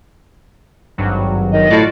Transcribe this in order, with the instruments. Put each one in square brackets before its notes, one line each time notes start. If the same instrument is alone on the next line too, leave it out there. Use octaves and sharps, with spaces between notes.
[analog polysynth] G#1 G2 F#3
[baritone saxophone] D#3 [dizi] D#5
[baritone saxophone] A2 [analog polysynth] F4 F#4 D5